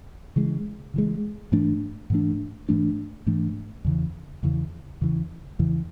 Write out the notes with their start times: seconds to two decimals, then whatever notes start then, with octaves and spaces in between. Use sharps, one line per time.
0.36 C#3 E3 G#3
0.94 C#3 E3 G#3
1.52 G#2 E3 A3 D4
2.10 G#2 E3 A3 D4
2.69 G#2 E3 A3 D4
3.26 G#2 E3 A3 D4
3.85 E2 C#3 E3
4.43 E2 C#3 E3
5.01 E2 C#3 E3
5.59 E2 C#3 E3